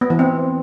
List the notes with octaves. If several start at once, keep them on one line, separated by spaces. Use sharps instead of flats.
B3
E3
C4